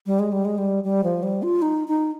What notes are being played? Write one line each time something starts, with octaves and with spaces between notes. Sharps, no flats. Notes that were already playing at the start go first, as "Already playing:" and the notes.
G3
G#3
G3
G#3
G3
G3
F3
G3
F4
D#4
D#4